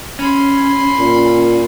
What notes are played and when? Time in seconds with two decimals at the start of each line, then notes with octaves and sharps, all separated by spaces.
0.19 C#4 B5 C6
0.99 A#2